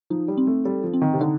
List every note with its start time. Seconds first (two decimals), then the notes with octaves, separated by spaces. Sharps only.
0.10 F3 D#4
0.28 G3
0.37 C4
0.47 A3
0.65 G3 A4
0.84 F3
0.93 C4
1.02 D#3
1.14 C3
1.21 D3 D#4